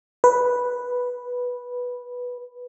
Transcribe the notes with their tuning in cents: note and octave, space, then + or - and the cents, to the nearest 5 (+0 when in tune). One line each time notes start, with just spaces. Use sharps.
B4 -10